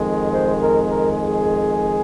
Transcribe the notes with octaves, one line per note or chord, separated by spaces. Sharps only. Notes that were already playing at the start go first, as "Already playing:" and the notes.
Already playing: F2 D#3 G#3
C5
A#4
A#4
G#4